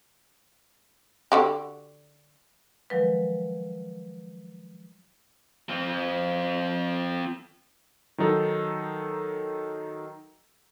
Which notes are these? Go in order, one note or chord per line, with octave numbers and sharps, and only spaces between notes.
D3 F#4 G4
D#3 F3 F#3 G#3 A#4 B4
F3 C4
D#3 F#3 D#4 A4